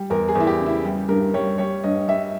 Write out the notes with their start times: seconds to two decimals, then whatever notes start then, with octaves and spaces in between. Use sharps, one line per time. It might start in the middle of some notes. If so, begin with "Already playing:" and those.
Already playing: G3
0.10 E2 A#4
0.28 G#4
0.35 E2
0.40 E4
0.47 G4
0.60 C#3
0.66 E4
0.85 G3
1.09 G2 A#4
1.34 G3 C#5
1.58 G3 C#5
1.84 G2 D#5
2.08 G3 E5